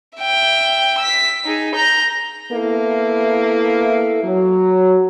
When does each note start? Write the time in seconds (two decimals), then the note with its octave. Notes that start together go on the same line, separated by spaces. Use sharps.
0.17 E5 G5
0.98 E6 B6
1.44 D#4 G#4
1.75 A#5 G6
2.51 A#3 B3 E4 A4
4.23 F#3